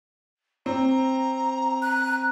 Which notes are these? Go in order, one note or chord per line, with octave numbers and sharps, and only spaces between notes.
C4 A#5
F#6